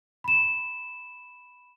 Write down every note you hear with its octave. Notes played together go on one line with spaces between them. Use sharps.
B5 E7